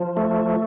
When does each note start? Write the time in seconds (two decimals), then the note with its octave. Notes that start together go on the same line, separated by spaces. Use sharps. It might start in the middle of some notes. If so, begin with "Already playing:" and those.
Already playing: F3
0.17 A3